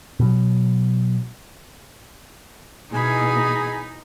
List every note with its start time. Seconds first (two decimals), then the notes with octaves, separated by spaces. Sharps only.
0.20 B2 F#3
2.92 B2 E3 D#4 G#4 G#5 B5